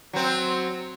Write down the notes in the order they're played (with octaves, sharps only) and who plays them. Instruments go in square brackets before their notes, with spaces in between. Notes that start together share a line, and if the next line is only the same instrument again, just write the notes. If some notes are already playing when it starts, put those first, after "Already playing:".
[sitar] F#3 C4